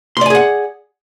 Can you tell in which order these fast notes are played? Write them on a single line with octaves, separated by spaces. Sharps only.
C6 D5 G#5 G#4 F#5